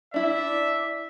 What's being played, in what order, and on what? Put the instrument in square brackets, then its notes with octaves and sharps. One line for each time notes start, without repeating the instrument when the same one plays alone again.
[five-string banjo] D4 E4 [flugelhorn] D5 [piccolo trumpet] E5